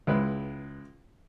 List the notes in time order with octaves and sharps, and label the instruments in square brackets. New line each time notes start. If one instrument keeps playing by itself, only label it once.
[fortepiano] C#2 G#3 E4 B4